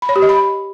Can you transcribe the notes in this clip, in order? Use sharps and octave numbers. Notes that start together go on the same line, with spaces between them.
B5
C#5
G4
D#5
B5